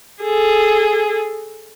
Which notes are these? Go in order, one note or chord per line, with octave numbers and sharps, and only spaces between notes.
G#4 A4